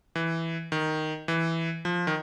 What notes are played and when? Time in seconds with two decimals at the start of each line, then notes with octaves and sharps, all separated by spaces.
0.15 E3
0.72 D#3
1.28 E3
1.85 F3
2.07 D#3